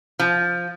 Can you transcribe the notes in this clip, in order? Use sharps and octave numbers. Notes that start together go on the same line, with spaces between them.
F3